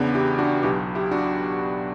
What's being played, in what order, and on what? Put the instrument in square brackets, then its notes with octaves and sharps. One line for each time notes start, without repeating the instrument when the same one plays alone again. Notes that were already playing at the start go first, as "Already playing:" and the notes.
Already playing: [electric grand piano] E2 C#3 E3 B3 D4
E4 G4
D4 F#4
B1 B2 E4 G4
E4 G4
D4 F#4